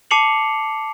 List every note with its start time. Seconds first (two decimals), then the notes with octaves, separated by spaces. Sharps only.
0.11 A5 D6 C7 C#7 F7 F#7